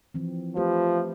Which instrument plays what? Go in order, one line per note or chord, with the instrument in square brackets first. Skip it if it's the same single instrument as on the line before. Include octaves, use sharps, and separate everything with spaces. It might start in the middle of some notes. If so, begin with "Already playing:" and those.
[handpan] E3 F3 C4
[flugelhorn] F3 [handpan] A3 G4 B4